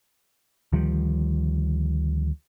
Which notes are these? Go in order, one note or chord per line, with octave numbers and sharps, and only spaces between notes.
D2 D#3 F3 G3